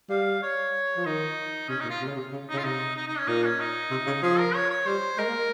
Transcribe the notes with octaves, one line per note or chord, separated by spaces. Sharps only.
G3 F5
C#5
F3
D#3 D#4
C3 C#4
A#2 D#4
F4
C3
C#3
C3
C#3
C#3 D#4
F4
C3 D#4
D#4
D#4
C#4
A#2 D#4
C#4
D#4
C3
C#3
F3 G#4
A#4
C#5
C#5
G3 C5
G#3 A#4
A#3